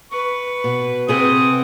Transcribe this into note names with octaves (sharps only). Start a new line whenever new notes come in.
B4 C#6
B2
C3 C4 G#4 B4 F#5 D#6